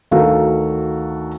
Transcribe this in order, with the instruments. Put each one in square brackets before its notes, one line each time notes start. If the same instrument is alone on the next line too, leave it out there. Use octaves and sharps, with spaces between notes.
[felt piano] D2 D#3 F#4 A4 A#4 F5